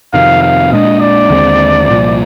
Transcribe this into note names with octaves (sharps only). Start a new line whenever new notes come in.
F2 C3 D#3 F5
F5
A#2 G#3 D4 D#5
D5
D#2 D3 G#3 C4
C2 A#2 F3